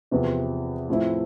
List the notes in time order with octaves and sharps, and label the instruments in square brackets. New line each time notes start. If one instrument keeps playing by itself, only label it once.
[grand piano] E2 C3 F3 B3
A2 F3 C4 E4